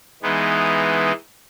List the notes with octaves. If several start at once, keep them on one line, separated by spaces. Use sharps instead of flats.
E3 G#3 B3 D#4